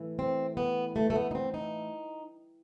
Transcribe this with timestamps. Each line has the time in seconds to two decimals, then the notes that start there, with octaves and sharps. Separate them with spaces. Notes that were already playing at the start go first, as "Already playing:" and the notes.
Already playing: A2 E3
0.19 C4
0.57 B3
0.96 A3
1.10 A3
1.16 B3
1.31 D#4
1.35 C4
1.54 D#4